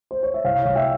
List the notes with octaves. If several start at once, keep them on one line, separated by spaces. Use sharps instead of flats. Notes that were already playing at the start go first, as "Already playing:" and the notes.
C5
C#5
E5
C2 C#5 F5
C2
E5 G5